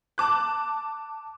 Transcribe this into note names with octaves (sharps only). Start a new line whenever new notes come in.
A5 D6 F#6